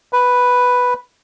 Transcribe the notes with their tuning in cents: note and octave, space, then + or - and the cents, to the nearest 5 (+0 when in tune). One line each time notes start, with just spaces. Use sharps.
B4 +0